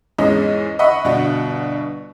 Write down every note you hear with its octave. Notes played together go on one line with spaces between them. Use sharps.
E2 G#2 G#3 C#4 D#5
D#5 E5 F#5 B5 C#6
G1 B2 D4 F#5